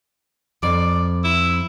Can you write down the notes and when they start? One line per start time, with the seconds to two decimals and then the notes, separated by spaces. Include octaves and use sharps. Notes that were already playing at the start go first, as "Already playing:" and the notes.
0.63 F2 D5
1.24 E4